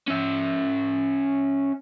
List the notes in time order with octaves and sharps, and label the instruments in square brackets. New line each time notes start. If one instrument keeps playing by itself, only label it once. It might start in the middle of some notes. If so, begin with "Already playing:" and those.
[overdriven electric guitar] C#4 E5